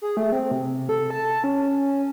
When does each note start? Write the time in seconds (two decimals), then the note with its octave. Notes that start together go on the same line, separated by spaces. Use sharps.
0.02 G#4
0.17 A3
0.32 C4
0.51 C3
0.89 A4
1.11 A5
1.44 C#4